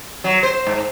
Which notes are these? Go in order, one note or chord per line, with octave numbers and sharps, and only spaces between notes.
F#3
C5
G#2